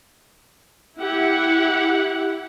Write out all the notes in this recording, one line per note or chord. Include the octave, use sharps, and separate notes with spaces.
E4 G4 F#5